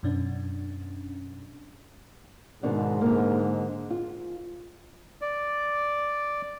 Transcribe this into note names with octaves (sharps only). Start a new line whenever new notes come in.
F#2 B2 C#4 D4
G#2 B2 D#3 D4
D3 A#3
F4
D5